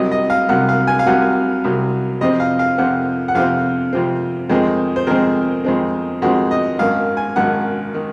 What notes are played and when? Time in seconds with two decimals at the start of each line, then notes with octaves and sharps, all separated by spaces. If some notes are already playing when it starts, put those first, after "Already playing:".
Already playing: C2 C3 F#3 D#5
0.11 D#5
0.30 F5
0.49 C2 C3 F#3 F#5
0.69 F5
0.87 G#5
0.99 F5
1.06 C2 C3 F#3 F#5
1.64 C2 C3 F#3
2.21 F2 C3 F3 C4 D#5
2.40 F5
2.59 F5
2.78 F2 C3 F3 C4 F#5
3.28 F#5
3.35 F2 C3 F3 C4 F5
3.93 F2 C3 F3 C4
4.50 F2 D#3 G#3 C4
4.96 C5
5.07 F2 D#3 G#3 C4 A#4
5.64 F2 D#3 G#3 C4
6.22 F2 D#3 G#3 C4 F#4
6.51 D#5
6.79 G#1 F#2 D#3 F5
7.17 G#5
7.36 G#1 F#2 D#3 F#5
7.94 D#3